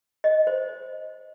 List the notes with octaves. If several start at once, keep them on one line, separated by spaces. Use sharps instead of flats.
D#5
C5